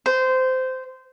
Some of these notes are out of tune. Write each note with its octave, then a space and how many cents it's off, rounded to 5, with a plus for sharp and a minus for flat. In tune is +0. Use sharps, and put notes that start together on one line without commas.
C5 -20